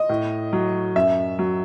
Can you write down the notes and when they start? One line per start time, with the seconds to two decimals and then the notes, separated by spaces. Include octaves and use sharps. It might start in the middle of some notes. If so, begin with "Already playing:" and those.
Already playing: D#5
0.09 A2
0.53 F#3
0.96 F#2 E5
1.39 F#3